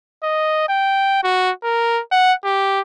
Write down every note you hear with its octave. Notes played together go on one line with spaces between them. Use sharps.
D#5
G5
F#4
A#4
F#5
G4